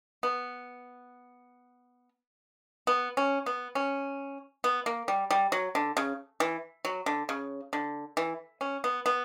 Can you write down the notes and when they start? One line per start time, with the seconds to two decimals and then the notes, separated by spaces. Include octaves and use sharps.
0.23 B3
2.87 B3
3.17 C#4
3.46 B3
3.75 C#4
4.64 B3
4.86 A#3
5.08 G3
5.31 G3
5.52 F#3
5.75 D3
5.97 C#3
6.40 E3
6.85 F#3
7.06 D3
7.29 C#3
7.73 D3
8.17 E3
8.61 C#4
8.84 B3
9.06 B3